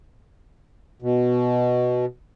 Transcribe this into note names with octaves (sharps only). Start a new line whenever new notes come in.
B2